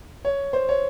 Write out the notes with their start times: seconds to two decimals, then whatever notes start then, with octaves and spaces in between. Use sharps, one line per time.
0.25 C#5
0.53 C5
0.69 C#5